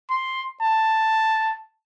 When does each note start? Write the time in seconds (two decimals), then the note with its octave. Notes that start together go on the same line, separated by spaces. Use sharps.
0.10 C6
0.62 A5